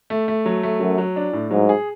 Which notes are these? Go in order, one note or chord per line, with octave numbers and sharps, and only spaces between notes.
A3
A3
F#3
A3
F#2 F#3
F#3
D4
A2
G#2 F#3
G#4